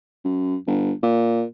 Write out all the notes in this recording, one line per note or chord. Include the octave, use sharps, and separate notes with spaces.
F#2
G1
A#2